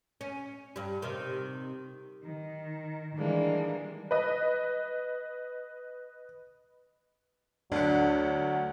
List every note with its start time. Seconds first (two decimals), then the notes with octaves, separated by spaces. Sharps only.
0.21 C#4
0.76 G2 G3
1.02 C3 D#3
2.22 D#3
3.14 D#3 E3 G3 G#3 A#3 D4
4.11 B4 D#5
7.72 D2 F#3 D4 F#5